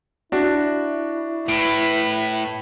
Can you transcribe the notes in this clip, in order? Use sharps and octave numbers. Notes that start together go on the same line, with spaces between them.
D4 E4 F#4
A2 B4 D7